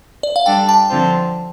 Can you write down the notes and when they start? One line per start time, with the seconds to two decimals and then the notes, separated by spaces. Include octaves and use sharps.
0.23 D5
0.36 F5
0.46 G3 D4 A4 D5 G5
0.69 A5
0.89 D3 F3 C4 F4 C5